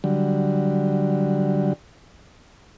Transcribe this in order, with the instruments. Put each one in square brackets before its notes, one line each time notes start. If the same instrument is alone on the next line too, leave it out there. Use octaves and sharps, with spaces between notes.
[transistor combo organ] D3 F#3 G3